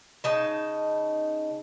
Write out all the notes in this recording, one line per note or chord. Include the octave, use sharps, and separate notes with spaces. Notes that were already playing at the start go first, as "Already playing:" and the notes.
C#3 D#4 A5